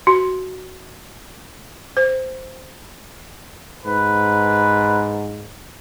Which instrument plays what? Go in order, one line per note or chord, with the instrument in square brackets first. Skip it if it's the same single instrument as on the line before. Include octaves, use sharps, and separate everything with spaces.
[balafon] F#4
C5
[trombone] G#2 [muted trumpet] B4